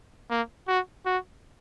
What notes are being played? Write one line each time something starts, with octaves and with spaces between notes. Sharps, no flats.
A#3
F#4
F#4